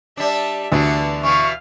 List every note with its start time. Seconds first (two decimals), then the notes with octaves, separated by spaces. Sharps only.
0.17 G3 D4 E5 A5
0.72 D2 D3 E3 B3 A5
1.23 B2 E3 F5 C#6